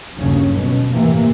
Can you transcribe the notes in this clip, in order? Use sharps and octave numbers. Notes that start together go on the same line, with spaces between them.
G1 D#2 C#3 F#3 C#4
B2
A2 C3 E3 A#3